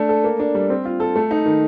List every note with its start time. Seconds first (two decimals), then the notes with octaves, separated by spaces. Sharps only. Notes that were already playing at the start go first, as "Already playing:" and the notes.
Already playing: A3 D4
0.09 A4
0.24 A#3
0.39 D4
0.55 G3
0.70 C4
0.85 F4
1.00 A4
1.16 A3
1.31 D#4
1.46 D#3